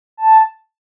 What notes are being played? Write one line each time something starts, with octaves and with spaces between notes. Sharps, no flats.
A5